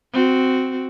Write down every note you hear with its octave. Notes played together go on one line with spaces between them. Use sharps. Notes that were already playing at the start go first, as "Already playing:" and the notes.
C4 F#4